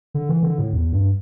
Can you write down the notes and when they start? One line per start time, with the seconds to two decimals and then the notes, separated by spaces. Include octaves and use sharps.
0.14 D3
0.29 E3
0.43 D3
0.58 A2
0.73 E2
0.93 G2